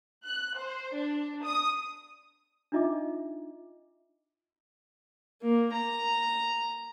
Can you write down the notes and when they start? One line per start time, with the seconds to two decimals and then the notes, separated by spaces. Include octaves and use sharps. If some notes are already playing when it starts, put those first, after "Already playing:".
0.23 F#6
0.57 C5
0.94 D4
1.43 D#6
2.72 D4 D#4 F4 D#5 E5 D6
5.42 A#3
5.72 A#5